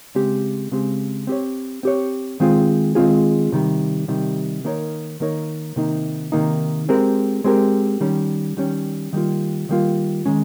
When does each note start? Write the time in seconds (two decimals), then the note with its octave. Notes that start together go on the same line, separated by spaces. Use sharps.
0.15 C#3 G#3 C4 G4
0.71 C#3 G#3 C4 G4
1.27 C4 G4 C#5
1.83 C4 G4 C#5
2.40 D#3 G#3 C4 F4 G#4
2.95 D#3 G#3 C4 F4 G#4
3.52 C3 D#3 G3
4.08 C3 D#3 G3
4.64 D#3 A#3 D#4 A#4 C#5
5.20 D#3 A#3 D#4 A#4 C#5
5.76 C3 D#3 A#3 D#4
6.32 C3 D#3 A#3 D#4
6.89 G#3 C4 G4 A#4
7.44 G#3 C4 G4 A#4
8.01 D#3 G3 C#4
8.57 D#3 G3 C#4
9.13 D#3 G3 A#3 F4
9.69 D#3 G3 A#3 F4
10.26 D#3 G#3 C#4